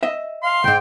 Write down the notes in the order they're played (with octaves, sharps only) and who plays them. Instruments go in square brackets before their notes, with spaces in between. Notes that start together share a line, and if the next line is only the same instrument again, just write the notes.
[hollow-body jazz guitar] D#5 E5
[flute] F5 [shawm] C6
[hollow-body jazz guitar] C#2 G#2 [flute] G5